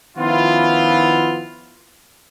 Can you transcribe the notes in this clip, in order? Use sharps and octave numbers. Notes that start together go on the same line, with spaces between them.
D#3 F3 B3 C#4 E4 F4